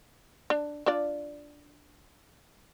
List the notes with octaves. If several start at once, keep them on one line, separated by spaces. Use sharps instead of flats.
D4
D4 F4 D5